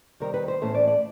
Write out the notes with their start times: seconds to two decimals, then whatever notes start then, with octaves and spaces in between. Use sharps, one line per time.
0.20 C3 D#3 G3 A#4
0.34 B4
0.48 C5
0.61 A2 E3 A3 C#4 C5
0.75 D5
0.87 D5